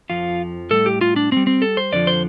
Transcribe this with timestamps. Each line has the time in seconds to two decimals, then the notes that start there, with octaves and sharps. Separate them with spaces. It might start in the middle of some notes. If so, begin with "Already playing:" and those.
0.10 F2 F3 F4
0.70 A2 G3 A4
0.86 G4
1.01 F4
1.16 D4
1.32 A2 G3 C4
1.47 C4
1.62 A4
1.77 C5
1.92 F2 D3 F3 D5
2.07 C5